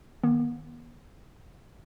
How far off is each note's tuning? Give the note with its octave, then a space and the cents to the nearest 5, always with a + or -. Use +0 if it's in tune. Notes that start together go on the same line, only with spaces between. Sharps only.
D#3 +0 B3 -40